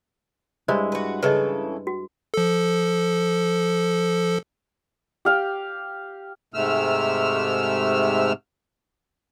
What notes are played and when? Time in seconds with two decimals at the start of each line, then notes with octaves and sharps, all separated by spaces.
0.68 G2 G#3 E4 C5
0.92 F#4 B4
1.23 C#3 E3 A4 B4 D#5
1.87 F#4
2.34 F3 A4
5.25 G4 F5 G5
6.54 G#2 C3 A3 E6 F6